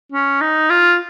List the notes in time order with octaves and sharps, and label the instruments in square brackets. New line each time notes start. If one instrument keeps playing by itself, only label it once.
[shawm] C#4
D#4
F4